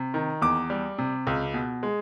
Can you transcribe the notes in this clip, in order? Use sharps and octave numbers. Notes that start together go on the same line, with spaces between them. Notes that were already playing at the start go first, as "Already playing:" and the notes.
Already playing: C3
D#3
E2 D6
G3
C3
C#2
B2
G#3